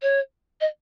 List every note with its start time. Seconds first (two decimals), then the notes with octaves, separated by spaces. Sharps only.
0.02 C#5
0.61 D#5